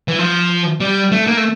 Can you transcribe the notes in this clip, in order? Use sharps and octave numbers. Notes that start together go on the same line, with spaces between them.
E3
F3
G3
A3
A#3
A3